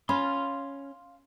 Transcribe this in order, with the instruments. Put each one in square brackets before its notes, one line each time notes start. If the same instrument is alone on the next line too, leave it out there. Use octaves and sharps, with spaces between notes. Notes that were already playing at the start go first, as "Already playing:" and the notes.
[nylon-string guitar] C#4 [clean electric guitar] F5 C6 [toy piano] B5